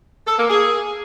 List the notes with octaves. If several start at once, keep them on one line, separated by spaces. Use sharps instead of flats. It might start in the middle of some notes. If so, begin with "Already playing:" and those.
A4
A#3
G#4